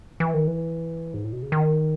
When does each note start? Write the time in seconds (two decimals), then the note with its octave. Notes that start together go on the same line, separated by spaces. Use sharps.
0.20 E3
0.34 D#3
0.47 E3
1.14 G#2
1.24 A2
1.33 B2
1.42 C#3
1.52 D#3